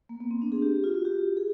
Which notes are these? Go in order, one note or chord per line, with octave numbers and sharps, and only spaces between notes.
A#3
B3
C4
D4
G#4
G4
F4
F#4
G4
G#4